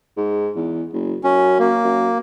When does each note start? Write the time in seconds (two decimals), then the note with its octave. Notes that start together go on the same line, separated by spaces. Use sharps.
0.17 G#2
0.56 E2
0.93 F#1
1.24 F#2 C#4
1.59 A#3
1.84 F#2